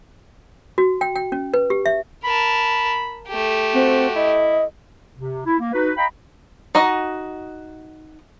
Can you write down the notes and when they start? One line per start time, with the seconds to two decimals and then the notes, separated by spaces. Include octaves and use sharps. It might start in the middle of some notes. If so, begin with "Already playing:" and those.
0.78 F#4
1.01 G5
1.16 G5
1.32 C#4
1.54 B4
1.70 G4
1.86 E5
2.24 A#4 A5 B5
3.28 A3 G4
3.74 C4 F#4
4.15 E4 D#5
5.16 C3
5.46 E4
5.60 A#3
5.73 D#4 F#4 B4
5.97 D#5 F5 G5 A#5 B5
6.75 D#4 F#4 D#5